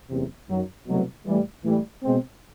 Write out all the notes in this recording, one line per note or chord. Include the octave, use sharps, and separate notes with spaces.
F#1 E2 C3
F#2 D#3 F#3
C2 B2 F#3 A3
A2 E3 G3
A2 E3 G3
B2 G#3 C4